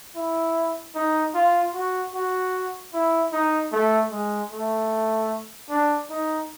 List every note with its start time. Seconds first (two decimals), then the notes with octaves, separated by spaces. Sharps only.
0.16 E4
0.95 D#4
1.35 F4
1.74 F#4
2.14 F#4
2.94 E4
3.33 D#4
3.73 A3
4.11 G#3
4.51 A3
5.70 D4
6.10 D#4